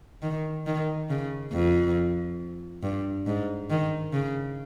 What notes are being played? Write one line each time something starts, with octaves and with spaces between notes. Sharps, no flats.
D#3
D#3
C#3
F2
G2
G#2
D#3
C#3